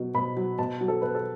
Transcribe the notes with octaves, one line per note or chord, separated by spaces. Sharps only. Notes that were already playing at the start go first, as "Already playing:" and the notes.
Already playing: B2 F#3
B2 B5
F#3
B2 A5
F#3
A4
B2 B4
A4